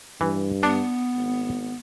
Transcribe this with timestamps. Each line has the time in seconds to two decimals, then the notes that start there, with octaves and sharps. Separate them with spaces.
0.21 G2 E3
0.63 B3 D4
1.15 G#1